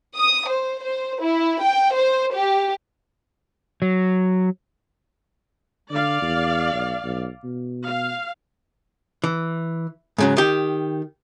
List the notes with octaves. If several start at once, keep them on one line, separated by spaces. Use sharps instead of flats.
D#6
C5
C5
E4
G5
C5
G4
F#3
D3 D5 F5
E2
B1
B1
B2
F5
E3
G#2 C#3 F#3
D#3 G4